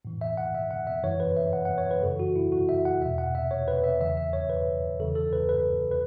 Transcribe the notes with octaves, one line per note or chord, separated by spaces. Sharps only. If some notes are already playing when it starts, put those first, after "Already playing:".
A2 E3
E5
F#5
E5
F#5
E5
F#2 E3 C#5
B4
E5
F#5
F#5
C#5
B4
F#2 C#3 E3 A4
F#4
E4
F#4
E5
F#5
E2 B2 E5
F#5
E5
C#5
B4
E5
E2 C#3 E3 E5
E5
C#5
B4
E2 C#3 E3 A4
A4
B4
B4
B4